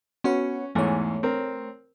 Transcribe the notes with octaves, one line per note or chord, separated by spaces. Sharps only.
B3 C#4 F#4 C#5
E2 G#2 E3 A3 C#5
C4 A#4